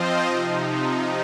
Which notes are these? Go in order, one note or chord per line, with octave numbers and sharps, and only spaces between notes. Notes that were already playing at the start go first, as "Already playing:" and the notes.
Already playing: F3 C4 F4 C5 D#5
C3 F3 D#4